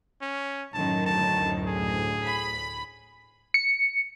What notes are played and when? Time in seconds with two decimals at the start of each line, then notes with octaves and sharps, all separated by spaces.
0.22 C#4
0.73 F#2 A2 D#3 A5
1.06 D2 A2 A5
1.67 G#4
2.25 B5
3.54 C#7